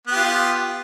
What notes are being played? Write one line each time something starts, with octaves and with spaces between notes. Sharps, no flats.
B3 F4 G4